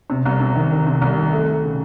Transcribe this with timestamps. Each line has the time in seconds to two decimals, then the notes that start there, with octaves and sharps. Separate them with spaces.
0.10 C3
0.25 C2
0.40 C3
0.55 D#3
0.71 D#3
0.87 C3
1.01 C2
1.17 D#3
1.32 A3
1.48 A3
1.63 C#3